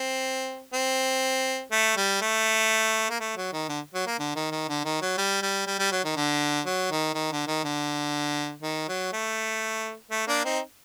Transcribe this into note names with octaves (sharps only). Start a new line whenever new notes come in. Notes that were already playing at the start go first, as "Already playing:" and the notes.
Already playing: C4
C4
A3
G3
A3
A#3
A3
F#3
D#3
D3
F#3
A#3
D3
D#3
D#3
D3
D#3
F#3
G3
G3
G3
G3
F#3
D#3
D3
F#3
D#3
D#3
D3
D#3
D3
D#3
F#3
A3
A3
A#3 D4
C4 D#4